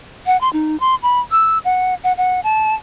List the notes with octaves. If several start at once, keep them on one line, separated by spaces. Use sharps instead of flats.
F#5
C6
D#4
C6
B5
E6
F#5
F#5
F#5
A5